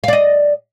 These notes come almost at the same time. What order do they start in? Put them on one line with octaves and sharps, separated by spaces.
F5 D5 D#5